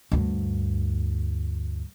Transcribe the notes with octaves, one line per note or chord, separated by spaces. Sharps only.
D2 G2